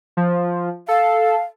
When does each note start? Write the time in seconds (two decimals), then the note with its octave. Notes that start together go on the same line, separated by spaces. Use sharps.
0.17 F3
0.88 A4 F5